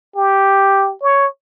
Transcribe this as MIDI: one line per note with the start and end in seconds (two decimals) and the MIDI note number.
0.16 0.94 67
1.02 1.26 73